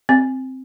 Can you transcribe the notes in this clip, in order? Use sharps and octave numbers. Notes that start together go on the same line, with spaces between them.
C4